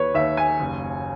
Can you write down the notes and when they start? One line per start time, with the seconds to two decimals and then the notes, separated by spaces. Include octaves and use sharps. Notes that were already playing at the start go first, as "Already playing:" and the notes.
Already playing: D#2 B4 C#5
0.14 D#2 E5
0.37 G#5
0.60 F#1